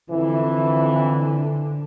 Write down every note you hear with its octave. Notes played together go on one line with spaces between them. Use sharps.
F2 D3 E3